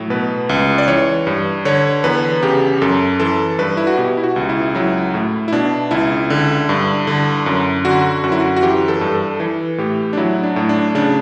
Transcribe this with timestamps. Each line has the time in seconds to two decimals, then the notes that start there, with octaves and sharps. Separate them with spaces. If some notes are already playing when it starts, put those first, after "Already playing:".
Already playing: A2 F#3
0.10 B2 B4
0.49 C#2
0.78 D5
0.87 E3 C#5
1.27 G2
1.65 D3 C#5
2.04 E2 B4
2.43 C#3 G4
2.82 F#2 A4
3.20 E3 A4
3.59 G2 B4
3.77 E4
3.87 F#4
3.98 B2 G4
4.17 E4
4.24 F#4
4.36 C#2
4.49 E4
4.75 F#3 E4
5.14 A2
5.48 E4
5.52 B2 D4
5.91 C#2 E4
6.30 D3
6.69 G2
7.07 D3
7.46 F#2
7.85 D3 F#4
8.24 F#2 F#4
8.32 E4
8.40 F#4
8.56 F#4
8.63 E3 G4
8.88 A4
9.01 G2
9.14 A4
9.40 E3
9.78 A2 G4
10.13 D4
10.17 F#3 E4
10.43 D4
10.56 A2
10.69 D4
10.95 C#3 D4